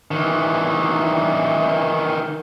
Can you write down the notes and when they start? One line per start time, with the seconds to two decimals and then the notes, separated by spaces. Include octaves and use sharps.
0.11 D#3 E3